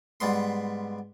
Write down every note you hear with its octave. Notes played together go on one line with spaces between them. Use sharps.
G#2 G3 B3 C6